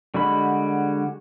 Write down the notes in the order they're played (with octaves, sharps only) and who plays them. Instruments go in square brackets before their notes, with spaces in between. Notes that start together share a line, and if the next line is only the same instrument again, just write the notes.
[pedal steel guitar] D3 G3 G#3 F#4 B5